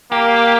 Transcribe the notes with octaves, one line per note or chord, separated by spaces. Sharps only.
A#3 G4